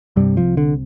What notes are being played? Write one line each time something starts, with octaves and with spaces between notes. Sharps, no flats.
C2 G2 C3 G3
F3
D3